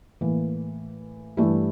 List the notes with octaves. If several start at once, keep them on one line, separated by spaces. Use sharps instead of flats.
A2 E3 A#3
G2 E3 A3 E4 G4